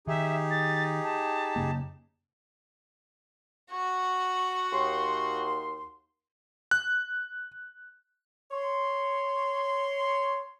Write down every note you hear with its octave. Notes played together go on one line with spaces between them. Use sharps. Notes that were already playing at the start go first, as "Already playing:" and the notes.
D#3 D#4 G4 G#4 E5
A6
A5
F#2 C#3 A#3
F#4 F#5 C#6
D#2 C6
F#6
C#5 C6